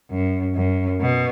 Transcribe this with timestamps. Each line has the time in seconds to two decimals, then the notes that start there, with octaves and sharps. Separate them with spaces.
0.10 F#2
0.55 F#2
1.01 B2